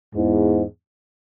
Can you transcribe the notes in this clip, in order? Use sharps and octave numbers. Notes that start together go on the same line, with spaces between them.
E2 G#2